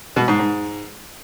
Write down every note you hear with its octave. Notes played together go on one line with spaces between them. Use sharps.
B2
G#2
G#2